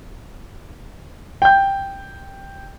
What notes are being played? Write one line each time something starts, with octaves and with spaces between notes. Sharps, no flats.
G5 G6